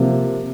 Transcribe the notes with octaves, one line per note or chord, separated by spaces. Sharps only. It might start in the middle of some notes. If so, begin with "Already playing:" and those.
Already playing: C3 F3 A#3